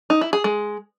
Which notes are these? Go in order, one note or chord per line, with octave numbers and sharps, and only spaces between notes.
D#4
E4
G#4
G#3